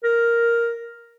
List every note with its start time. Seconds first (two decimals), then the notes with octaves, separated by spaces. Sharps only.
0.04 A#4